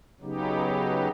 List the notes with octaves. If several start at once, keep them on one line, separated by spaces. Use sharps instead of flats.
C#3 F#3 B3 D#4 G4